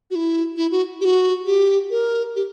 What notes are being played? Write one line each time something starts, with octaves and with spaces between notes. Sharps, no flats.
F#4
E4
E4
F#4
G4
F#4
G4
A#4
G4